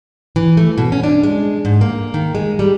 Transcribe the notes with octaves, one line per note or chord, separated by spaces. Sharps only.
E3
A3
B2
C#4
D4
G#3
G#2
A#3
D#3
G#3
G3